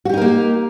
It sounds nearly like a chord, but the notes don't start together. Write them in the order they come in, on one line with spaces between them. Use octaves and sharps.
F#4 G4 D#4 A#4 A#3